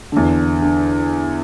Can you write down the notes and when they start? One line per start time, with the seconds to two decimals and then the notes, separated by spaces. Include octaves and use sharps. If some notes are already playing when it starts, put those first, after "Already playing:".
0.12 E2 D3
0.62 D3